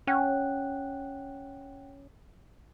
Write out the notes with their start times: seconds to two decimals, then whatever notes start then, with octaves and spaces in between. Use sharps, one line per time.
0.07 C#4 F#5 G5 F#6